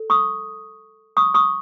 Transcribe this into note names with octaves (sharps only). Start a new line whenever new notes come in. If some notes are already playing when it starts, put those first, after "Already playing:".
Already playing: A4
C#6 D#6
C#6 D#6
C#6 D#6